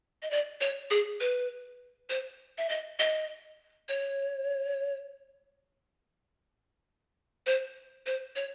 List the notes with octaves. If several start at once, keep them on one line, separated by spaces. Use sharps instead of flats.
D#5
D5
C#5
G#4
B4
C5
E5
D#5
D#5
C#5
C5
C5
C#5